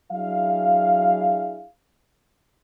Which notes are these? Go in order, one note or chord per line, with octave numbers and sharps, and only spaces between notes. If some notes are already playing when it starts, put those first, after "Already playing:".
F#3 D4 E4 G#4 F5